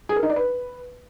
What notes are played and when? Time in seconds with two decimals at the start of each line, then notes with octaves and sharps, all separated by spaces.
0.09 G#4
0.16 A#4
0.23 D#4
0.30 D5
0.36 B4